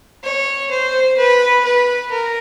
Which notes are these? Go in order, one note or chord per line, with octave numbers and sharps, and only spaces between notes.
C#5
C5
B4
B4
A#4